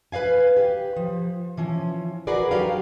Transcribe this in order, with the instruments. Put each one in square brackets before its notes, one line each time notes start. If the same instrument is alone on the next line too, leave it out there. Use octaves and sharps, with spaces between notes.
[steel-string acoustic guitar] B4 D5 F5 G#5
G4
F3
E3 F3 C#4
F#4 G#4 A#4 B4 D5
F#3 G4 A4 A#4 F5